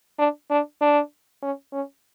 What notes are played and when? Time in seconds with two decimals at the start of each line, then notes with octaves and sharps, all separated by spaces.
0.18 D4
0.50 D4
0.81 D4
1.42 C#4
1.73 C#4